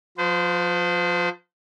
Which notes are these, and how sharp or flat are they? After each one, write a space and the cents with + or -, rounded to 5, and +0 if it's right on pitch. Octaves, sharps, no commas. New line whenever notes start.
F3 +25 C5 -35